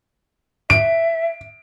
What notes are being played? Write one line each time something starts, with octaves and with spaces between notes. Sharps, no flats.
E5 D7